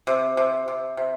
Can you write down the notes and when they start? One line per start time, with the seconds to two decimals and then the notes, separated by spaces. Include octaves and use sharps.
0.07 C3
0.37 C3
0.68 C3
0.97 C3